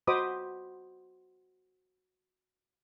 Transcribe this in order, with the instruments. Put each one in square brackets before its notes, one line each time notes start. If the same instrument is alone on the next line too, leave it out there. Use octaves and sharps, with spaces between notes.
[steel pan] F#4 C5 D#5 B5 D6 D#6